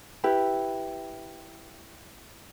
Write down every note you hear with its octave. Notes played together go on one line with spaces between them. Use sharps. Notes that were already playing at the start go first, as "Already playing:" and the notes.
E4 G4 B4